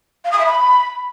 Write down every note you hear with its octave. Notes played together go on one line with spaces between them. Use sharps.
F5
D#6
E5
B5